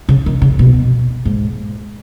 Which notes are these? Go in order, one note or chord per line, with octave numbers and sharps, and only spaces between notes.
C#3
D#3
C#3
B2
G#2